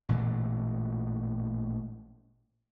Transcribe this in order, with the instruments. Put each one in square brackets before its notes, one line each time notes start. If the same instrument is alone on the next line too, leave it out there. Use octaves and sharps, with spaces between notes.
[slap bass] A1 A#2 E3 G#3